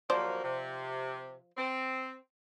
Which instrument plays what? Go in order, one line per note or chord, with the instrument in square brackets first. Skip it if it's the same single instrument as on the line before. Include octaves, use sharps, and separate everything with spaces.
[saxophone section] D#2 F#3 A#3 [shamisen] F3 C5 D5
[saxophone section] C3
C4